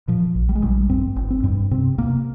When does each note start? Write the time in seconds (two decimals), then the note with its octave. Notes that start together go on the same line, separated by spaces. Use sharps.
0.08 A#2 F3
0.35 A#1
0.49 G3
0.55 G#3
0.62 A#1 G3
0.89 G2 C4
1.16 G1
1.30 C4
1.44 G2
1.71 C3 C4
1.98 C3 A#3